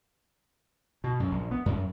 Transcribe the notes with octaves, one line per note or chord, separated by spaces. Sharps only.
B2
F#2
A#1
B3
F#2